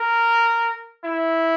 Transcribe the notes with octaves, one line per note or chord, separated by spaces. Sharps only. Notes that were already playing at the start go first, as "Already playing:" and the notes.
Already playing: A#4
E4